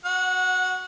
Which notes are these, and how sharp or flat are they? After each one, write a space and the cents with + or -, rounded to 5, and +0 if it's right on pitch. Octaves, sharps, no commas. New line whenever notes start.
F#4 +0 F#5 -20